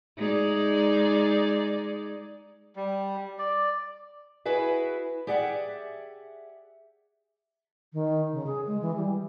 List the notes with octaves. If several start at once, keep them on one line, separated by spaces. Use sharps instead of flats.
G#3 D#4 D5
G3
D5
E4 F#4 G#4 B4 E5
G4 G#4 D5 E5 F#5
D#3
C#3
G#4
G#3
E3
G3